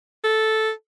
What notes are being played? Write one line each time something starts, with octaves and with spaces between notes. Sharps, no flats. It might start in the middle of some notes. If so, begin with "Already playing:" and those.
A4